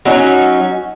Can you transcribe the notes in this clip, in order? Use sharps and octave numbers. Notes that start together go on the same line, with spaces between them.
F#3 C#4 D#4 F#4